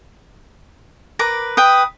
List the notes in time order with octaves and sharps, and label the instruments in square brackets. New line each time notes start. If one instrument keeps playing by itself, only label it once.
[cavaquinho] A#4 B4 D6
[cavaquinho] B4 G5 [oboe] D#6